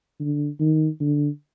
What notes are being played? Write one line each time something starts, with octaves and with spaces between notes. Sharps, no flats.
D3
D#3
D3